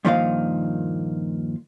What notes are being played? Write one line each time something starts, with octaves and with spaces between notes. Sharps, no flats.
G2 A#2 D#3 F3 D#4 F5